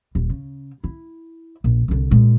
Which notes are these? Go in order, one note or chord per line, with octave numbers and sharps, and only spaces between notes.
D#1
C#3
E4
A#1
C2 D3
A#2 G#3